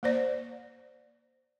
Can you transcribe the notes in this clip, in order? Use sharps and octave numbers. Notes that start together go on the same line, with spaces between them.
A#3 C5 D5